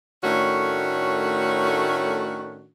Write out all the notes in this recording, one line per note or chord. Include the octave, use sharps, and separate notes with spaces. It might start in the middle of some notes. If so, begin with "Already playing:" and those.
A2 D#3 A3 C#4 D4 F#4